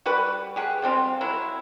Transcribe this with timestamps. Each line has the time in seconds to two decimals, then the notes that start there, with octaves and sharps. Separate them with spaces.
0.06 G3 F#4 G4 B4
0.56 G4 G#4 F#5
0.82 F3 G3 C4 F4
1.21 F#3 E4